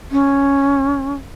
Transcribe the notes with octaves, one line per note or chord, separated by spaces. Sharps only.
C#4